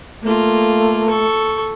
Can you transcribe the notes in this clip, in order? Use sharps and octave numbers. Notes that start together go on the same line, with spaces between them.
A3 A#3 F4
A4 C#6